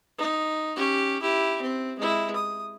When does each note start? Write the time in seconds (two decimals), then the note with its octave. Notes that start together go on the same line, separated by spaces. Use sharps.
0.18 D#4
0.76 C#4 G4
1.21 E4 G4
1.62 C4
1.98 G#3 E4
2.35 D#6